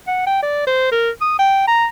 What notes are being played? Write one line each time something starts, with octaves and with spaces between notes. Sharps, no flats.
F#5
G5
D5
C5
A#4
D#6
G5
A#5